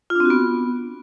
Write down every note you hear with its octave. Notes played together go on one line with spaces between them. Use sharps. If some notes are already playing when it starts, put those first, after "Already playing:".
F4
D4
C4
F#4
B3